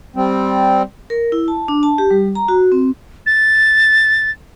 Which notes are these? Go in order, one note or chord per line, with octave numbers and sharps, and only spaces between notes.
G3 C4
A#4
E4
A5
D4
A5
G4
G3
A#5
F#4
C4
A6